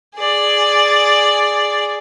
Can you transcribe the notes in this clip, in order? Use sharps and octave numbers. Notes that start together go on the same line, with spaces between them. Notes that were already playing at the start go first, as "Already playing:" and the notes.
G#4 D5